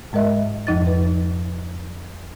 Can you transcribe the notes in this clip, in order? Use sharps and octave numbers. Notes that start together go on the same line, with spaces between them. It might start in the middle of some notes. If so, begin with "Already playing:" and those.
G#2 G#3 A#4 D#5 E5
F2 F3 D#4 D#5 A6
B4